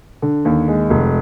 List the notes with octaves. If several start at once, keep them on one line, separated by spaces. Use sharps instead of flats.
D3
D#2
G#3
F1